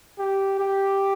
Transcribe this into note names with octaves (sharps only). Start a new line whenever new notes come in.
G4
G4